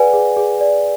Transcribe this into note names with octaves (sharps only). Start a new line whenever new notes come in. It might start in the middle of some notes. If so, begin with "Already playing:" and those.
Already playing: G#4 B4 D5 F#5 G#5
G#4
G#4
D5